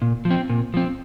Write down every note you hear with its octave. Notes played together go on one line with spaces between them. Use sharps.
A#2
F3
C4
A#2
F3 C4